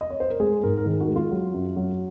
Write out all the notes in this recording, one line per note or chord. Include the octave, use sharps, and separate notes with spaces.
D#5
C#5
C5
A#4
G#3 G#4
G#2 A#4
A#4
D#3 G#4
F#4
G#3
F4
F#3
F#2
F#3